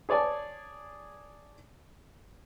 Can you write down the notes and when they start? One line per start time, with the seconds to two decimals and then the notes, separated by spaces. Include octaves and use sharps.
0.09 G#4 C#5 D5 G#5 A5